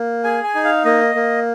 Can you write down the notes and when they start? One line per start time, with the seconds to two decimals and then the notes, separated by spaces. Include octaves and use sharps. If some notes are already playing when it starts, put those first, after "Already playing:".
Already playing: A#3
0.24 G#4 G#5
0.44 G#5
0.55 D#4
0.64 F5
0.85 A#3 D#5
1.15 A#3